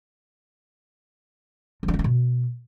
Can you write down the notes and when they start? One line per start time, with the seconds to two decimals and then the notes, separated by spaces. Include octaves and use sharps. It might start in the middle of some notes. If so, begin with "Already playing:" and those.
1.83 F3
1.88 D4
1.94 A#3
1.99 D4
2.04 B2